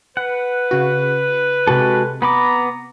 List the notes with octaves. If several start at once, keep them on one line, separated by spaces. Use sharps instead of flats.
B4 F#5
C#3 F#4
C3 G#3 F#4 G4 A4
B3 A#5 B5 D6